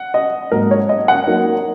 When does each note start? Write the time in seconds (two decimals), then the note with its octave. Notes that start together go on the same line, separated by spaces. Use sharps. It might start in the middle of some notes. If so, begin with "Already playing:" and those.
Already playing: F#5
0.14 D#5
0.52 G#2 F#3 A#3 A#4
0.71 C#5
0.89 D#5
1.08 F#5
1.27 F#3 A#3 D#4 A#4